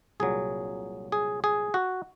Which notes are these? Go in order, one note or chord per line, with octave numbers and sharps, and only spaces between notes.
C2 A#2 F#3 G#4
G#4
G#4
F#4